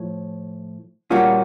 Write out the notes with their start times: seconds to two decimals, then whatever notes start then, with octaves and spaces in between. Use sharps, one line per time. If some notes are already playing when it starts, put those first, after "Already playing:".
Already playing: A2 F3
1.10 A#2 G3 A#3 C#4 F4 F#4